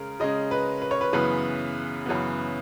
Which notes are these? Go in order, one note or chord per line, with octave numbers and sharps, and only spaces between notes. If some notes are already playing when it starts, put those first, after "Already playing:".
Already playing: C#3 G#3 A#4
C#3 G#3 C#4 D#5
B4
B4
C#5
B4
F#2 C#3 E3 B3 B4
F#2 C#3 E3 B3